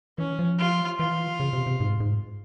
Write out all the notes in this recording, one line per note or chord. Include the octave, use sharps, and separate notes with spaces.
E3 C#4
F3
F4
E3 F4
C#3
C3
C3
G#2
G#2